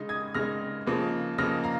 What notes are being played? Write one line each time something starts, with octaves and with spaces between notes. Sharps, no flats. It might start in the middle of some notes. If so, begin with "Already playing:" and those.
Already playing: C#3 G#3 D#4
D#6 G#6
C#3 G#3 D#4 F6 A#6
C#3 F3 A#3 D#4
C#3 F3 A#3 D#4 F6 A#6
F5 A#5